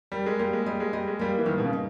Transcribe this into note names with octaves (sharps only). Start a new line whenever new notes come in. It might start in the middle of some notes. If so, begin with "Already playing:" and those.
G3 A#4
G#3
G3 A#3
G#3
G3 D#5
G#3
G3 D#5
G#3
G3 A#3
E3
D#3 G3
B2
C#3
D#4